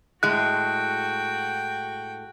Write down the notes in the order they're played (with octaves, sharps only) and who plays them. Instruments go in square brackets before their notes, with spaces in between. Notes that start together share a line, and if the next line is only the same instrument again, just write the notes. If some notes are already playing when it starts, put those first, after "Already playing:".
[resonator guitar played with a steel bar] A2 G#3 [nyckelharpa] F#4 G5 [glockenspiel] F#6